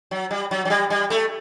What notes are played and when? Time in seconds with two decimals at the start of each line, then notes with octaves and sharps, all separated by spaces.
0.11 F#3
0.31 G3
0.51 F#3
0.65 F#3
0.70 G3
0.90 G3
1.10 A3